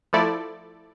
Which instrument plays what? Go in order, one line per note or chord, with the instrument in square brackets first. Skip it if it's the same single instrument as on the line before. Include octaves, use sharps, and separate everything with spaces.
[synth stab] F3 A3 E4 A4 D5